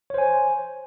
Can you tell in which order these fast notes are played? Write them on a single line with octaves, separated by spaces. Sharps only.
C#5 C5 G#5